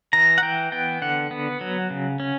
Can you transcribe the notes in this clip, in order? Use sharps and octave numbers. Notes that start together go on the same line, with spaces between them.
E3 A#5
F#5
E3 G5
B3 G5
D3 F#5
B3
F#3
C#3
C#4